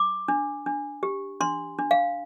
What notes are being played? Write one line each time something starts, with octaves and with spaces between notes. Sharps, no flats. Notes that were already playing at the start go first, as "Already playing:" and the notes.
Already playing: D6
D4
D4
G4
D4 C6
D4
F5